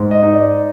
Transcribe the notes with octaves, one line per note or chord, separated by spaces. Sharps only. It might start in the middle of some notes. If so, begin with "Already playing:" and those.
Already playing: G#2
D#5
D#4
D5